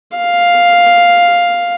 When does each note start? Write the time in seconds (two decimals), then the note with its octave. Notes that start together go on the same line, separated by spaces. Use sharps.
0.18 F5